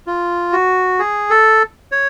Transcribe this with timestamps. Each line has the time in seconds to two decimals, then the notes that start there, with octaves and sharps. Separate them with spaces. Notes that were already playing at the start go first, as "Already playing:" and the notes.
0.07 F4
0.53 F#4
0.99 G#4
1.30 A4
1.92 C#5